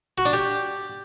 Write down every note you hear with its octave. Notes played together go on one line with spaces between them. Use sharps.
F#4
D4
G4